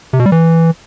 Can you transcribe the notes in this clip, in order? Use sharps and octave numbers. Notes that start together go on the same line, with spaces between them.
C3
B2
G3
E3